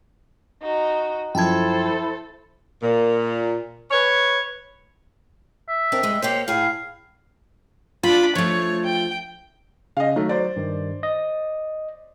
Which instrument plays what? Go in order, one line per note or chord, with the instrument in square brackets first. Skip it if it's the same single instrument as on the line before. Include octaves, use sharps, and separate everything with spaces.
[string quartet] D#4 F#4
[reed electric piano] F#2 F3 G#6 [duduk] E4 [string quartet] A4 C5 [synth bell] G5 A5
[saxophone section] A#2
B4 C#5
[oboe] E5
[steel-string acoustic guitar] C4 D4 A#4
G2 G#3
[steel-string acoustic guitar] A#3 G4 C#5 [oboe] C5
[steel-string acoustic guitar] A2 G#4 [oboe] F5
[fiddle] D4 B5 [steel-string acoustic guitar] F4
[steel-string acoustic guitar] F3 A3 [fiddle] C#5
[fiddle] G5
[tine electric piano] C#3 [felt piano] D#5 F5
[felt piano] D#3 A3 [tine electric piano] F#3
[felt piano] C5 D5
[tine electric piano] G2 D#3
D#5